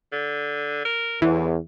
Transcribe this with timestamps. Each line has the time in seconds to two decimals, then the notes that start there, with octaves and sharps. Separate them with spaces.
0.13 D3
0.85 A#4
1.22 E2 A2 E3